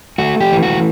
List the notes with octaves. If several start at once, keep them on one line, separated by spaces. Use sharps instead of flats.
A3 F#4
G4
E3
F#4